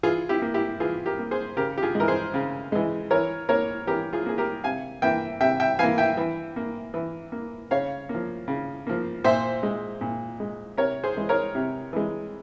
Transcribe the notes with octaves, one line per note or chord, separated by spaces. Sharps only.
E3 F4 G#4
E4 G4
A#3
E4 G4
E3 F4 G#4
G4 A#4
A#3
G#4 C5
C#3 G4 A#4
G4
F4 G#4
G#3
E3 A#4
G#4 C5
C#3
E3 G#3
E3 A#4 C#5
A#3 A#4 C#5
E3 G4 A#4
F4 G#4
A#3 G#4
G4 A#4
C3 F5 G#5
E3 A#3 E5 G5
C3 E5 G5
E5 G5
E3 A#3 F5 G#5
E5 G5
E3
A#3
E3
A#3
C#3 C#5 F5
A#3
F3
C#3
F3 A#3
A#2 C5 E5
G#3
A#2
G#3
C3 A#4 C#5
G#4 C5
E3 G#3
A#4 C#5
C3
E3 G#3